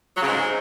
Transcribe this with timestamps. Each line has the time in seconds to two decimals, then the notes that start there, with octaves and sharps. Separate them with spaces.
0.17 F#3
0.22 C#3
0.27 G#2